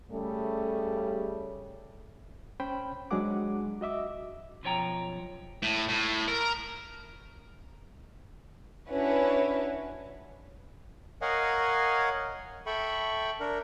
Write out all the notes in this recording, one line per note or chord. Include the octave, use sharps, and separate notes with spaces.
C#3 G3 A3
C#4 C5 G5 B5
F#3 G#3 D4 G#4 F#5 D6
F#4 D#5 E5 D6
B1 F#2 F3 C#5 G5 A#5
A2
A2
A#4
C#4 D4 E4 F#4 B4
A#4 C#5 D#5 F5 F#5 G#5
A4 E5 G5 B5 C#6
D4 A#4